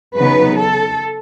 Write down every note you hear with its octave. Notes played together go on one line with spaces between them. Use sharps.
C#3 F#3 B3 D#4 B4
A4